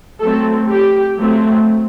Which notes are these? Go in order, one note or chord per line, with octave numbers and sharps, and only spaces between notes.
F#3 A3 C4 A4
G4
F#3 A3 C4